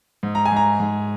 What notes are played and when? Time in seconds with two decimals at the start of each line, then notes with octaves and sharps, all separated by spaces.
0.23 G#2
0.35 A#5
0.46 G#5
0.52 G#2 A#5
0.80 G#2